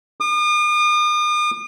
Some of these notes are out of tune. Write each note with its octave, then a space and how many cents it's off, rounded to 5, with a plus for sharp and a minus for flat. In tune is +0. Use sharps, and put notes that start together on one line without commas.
D#6 -45